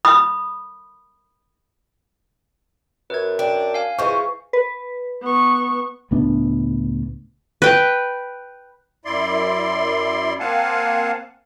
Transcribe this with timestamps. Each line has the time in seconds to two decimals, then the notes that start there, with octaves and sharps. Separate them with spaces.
0.05 B5 D#6
3.10 F#2 B4 G#6
3.39 D4 G5
3.74 F5 G#5
3.99 E3 G#3 F4 C5 C#6
4.53 B4
5.22 B3 C#6
6.11 C#2 A2 B3 D4
7.62 B4 G5
9.05 F#2 E4 D5 C6
10.40 A#3 C4 F5 F#5 G#5 A5